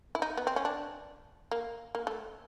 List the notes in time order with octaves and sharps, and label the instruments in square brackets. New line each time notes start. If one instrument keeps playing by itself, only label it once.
[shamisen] E4
D#4
B3
C4
C#4
D4
A#3
A#3
A3